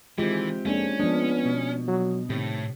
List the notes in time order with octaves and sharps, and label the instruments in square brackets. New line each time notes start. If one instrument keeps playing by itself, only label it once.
[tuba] D#3 [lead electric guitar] E3 [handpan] G#3 F4 [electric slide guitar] C4 G4
[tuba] F2 [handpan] G#3 A#3 D4 [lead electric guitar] C#4
[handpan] F3 D4 [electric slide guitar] G#3 [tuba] B3
[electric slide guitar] B2
[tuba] F#3
[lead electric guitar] A2 [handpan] C3 [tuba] D#3